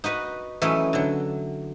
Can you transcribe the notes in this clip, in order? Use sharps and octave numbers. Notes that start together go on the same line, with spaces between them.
D#4 F#4 B4 D#5
E3 F#3 A3 C#4 D#4 E4
D3 F#3